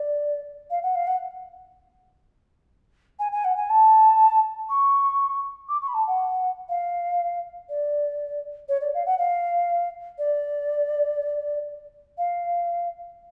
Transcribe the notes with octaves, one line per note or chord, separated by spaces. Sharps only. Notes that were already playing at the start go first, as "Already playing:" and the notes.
Already playing: D5
F5
F#5
F5
F#5
G#5
G#5
F#5
G#5
A5
C#6
D6
C#6
B5
A5
F#5
F5
D5
C#5
D5
F5
F#5
F5
D5
F5